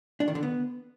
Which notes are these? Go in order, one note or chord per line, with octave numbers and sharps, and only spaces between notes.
D4
D#3
D3
B3